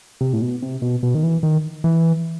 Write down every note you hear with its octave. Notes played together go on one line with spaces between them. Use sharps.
C3
A2
B2
C3
B2
B2
D#3
E3
D#3
E3